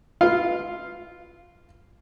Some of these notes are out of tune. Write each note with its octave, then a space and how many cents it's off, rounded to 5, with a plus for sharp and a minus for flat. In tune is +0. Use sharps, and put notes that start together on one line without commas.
F4 -10 B4 +0 F5 +0